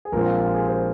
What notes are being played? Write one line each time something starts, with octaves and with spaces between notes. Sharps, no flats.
G#4
A#1 A#2 G#3 C4 A#4
F4
G4
G#4
C5